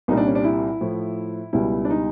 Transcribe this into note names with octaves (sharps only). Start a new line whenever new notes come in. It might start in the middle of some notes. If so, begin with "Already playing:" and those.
C2 A#2 G3 D#4
D4
C#4
D4
E4
A2 F3
C#2 B2 G3 E4
D4
D#4